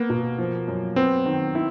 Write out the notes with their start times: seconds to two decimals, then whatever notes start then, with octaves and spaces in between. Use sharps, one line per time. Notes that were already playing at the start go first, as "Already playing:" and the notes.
Already playing: A#3 B3
0.10 B2
0.38 F3
0.68 F#2
0.96 B3 C4
1.26 D#3
1.55 E4